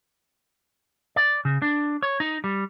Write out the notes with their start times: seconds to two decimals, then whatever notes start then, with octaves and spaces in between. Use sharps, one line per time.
1.16 D5
1.45 C#3
1.62 D4
2.03 C#5
2.20 D#4
2.44 G3